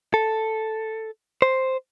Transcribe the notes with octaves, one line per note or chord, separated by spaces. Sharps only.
A4
C5